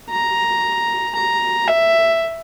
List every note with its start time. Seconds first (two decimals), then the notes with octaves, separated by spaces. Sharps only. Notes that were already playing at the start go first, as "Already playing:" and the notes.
0.10 A#5
1.15 A#5
1.67 E5